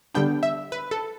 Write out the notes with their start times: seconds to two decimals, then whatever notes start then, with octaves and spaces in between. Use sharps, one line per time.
0.14 D3 G3 B3 D4 G5
0.43 E5
0.72 B4
0.91 A4